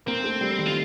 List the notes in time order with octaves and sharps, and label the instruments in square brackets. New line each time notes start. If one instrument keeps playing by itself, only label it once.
[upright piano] A#3 [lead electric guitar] C4
[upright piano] A3
G3
D#3
[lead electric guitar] F4